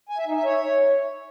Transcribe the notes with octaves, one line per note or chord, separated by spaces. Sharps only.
G#5
E5
D#4
E5
C#5